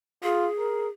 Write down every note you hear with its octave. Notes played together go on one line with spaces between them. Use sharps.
F4 G#4
A#4